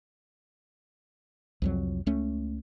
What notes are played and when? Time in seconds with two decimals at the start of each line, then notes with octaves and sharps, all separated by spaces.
1.62 C2 F2 F#3
2.06 C#2 A3 C#4